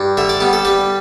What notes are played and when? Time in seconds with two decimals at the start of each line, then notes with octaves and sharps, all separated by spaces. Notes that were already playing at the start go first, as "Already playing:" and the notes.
Already playing: G2
0.17 D3 E5
0.29 D5
0.41 G3 B3
0.53 A4
0.65 G3 B4